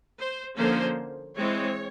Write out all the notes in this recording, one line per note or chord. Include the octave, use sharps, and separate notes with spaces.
C5
D3 F3 A#3 C#4 C5
E3 G#3 C4 C#5